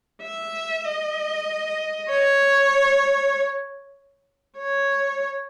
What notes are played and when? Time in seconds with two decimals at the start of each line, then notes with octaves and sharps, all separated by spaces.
0.23 E5
0.85 D#5
2.09 C#5
4.58 C#5